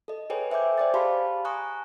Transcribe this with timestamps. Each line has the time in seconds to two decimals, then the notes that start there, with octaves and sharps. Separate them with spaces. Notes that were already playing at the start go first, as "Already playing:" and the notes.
0.08 A4 D#5
0.30 G#4 A4 B4 C#5 G5 G#5
0.51 C5 E5 G5 G#5 D6 G6
0.78 C5 D5 G5 D6 A6
0.94 G4 G#4 F5 A5 B5 C6
1.45 G#5 A#5 C#6 D#6 F#6